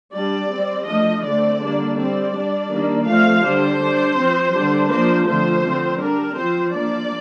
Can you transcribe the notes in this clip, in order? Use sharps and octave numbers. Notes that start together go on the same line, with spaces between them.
G3 D4 D5
G3 C4
F3 A3 D4 D#5
D3 A3 C4 D5
D3 G3 A#3 D4
G3 C4 D5
G3 D4
D#3 G3 A#3 D4
F3 A3 C4 F5
D3 G3 D4 C5
G3 D4
F3 C4
D3 G3 D4
F3 A#3 D4 C5
D3 F3 A3 C4 C5
D3 F3 C4
G3 D4 A#4
F3 C4 C5
F3 A#3 D4 D5